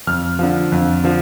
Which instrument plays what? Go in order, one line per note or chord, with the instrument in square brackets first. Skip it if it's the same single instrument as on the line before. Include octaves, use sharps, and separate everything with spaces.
[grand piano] F2 F6
D3 F3
F2
D3 F3